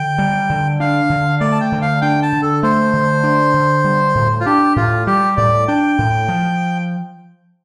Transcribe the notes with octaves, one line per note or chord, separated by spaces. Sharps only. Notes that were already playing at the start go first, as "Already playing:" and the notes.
Already playing: D3 G5
G3
D3
D4 F5
D3
A3 D5
A5
G5
D3
F5
D4 G5
A5
D3
A4
A3 C5
D3
D4
D3
G3
A2
F4
D4 G4
A2 F4
G3 G4
A2 D5
D4 G5
A2
F3